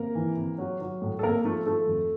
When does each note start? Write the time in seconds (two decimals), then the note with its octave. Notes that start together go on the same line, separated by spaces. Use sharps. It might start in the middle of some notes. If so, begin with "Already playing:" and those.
Already playing: C3 A#3 A#4
0.15 E3
0.37 C3
0.58 F#3
0.81 F#3
1.02 A2
1.19 A4
1.23 C3 A#3 A#4
1.45 F3 A3 A4
1.66 F3 A3 A4
1.88 F2